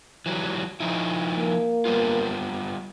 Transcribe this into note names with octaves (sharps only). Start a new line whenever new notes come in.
E3 F#3 G3
F3 D#4 E4
A#3
G3 B3 F4